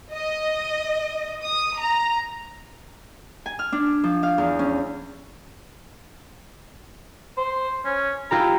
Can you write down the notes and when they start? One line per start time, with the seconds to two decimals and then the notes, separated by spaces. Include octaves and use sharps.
0.14 D#5
1.45 D#6
1.78 A#5
3.46 G#5
3.59 F6
3.72 D4
4.04 F3
4.23 F5
4.38 E2
4.59 C#4
7.37 C5
7.84 C#4
8.31 E4 F4 G4 A#5